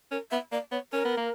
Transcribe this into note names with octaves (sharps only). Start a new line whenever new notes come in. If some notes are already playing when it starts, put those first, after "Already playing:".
C#4 A#4
B3 E5
A#3 D5
B3 C#5
C#4 A#4
B3
A#3